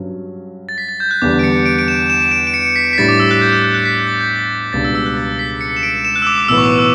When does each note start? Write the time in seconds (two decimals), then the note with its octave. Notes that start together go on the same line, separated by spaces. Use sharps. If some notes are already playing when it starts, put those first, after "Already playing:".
Already playing: G2 F#3 C#4
0.69 A6
0.78 B6
0.89 A6
1.00 G6
1.11 F#6
1.22 E2 D3 G3 D6
1.39 D7
1.44 C#7
1.66 D7
1.79 D7
1.88 E7
2.10 E7
2.31 D7
2.47 D7
2.54 C#7
2.76 B6
2.93 B6
2.98 A2 G3 D4 A6
3.09 D6
3.20 E6
3.31 F#6
3.41 G6
3.53 F#6
3.64 F#6
3.74 F#6
3.85 B6
4.07 A6
4.21 G6
4.36 A6
4.73 C#2 B2 G3 D4 A6
4.84 E6
4.95 E6
5.06 F#6
5.17 A6
5.39 B6
5.61 C#7
5.77 E7
5.83 D7
6.05 E7
6.16 F#6
6.22 E6
6.27 D6
6.38 D6
6.49 B1 A2 E3 B3 E6
6.58 C#6
6.63 D6
6.79 E6